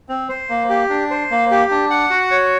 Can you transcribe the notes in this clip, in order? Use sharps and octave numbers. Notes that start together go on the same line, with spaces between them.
C4
C5
A#3
G4
D4
C5
A#3
G4
D4
F#5
F#4
C#5